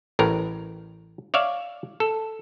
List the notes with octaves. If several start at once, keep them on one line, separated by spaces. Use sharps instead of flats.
A1 A2 A#4
C#5 D5 E5 F5
A4